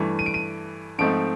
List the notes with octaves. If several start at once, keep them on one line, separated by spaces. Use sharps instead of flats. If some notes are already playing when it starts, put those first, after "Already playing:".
Already playing: G2 E3 A3
D#7
D7
D#7
G#2 F3 A3 C4 D#4 D7